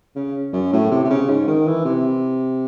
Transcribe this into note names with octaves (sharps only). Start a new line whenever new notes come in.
C#3
F#2
A2
C3
C3
C#3
G#2
D#3
E3
C3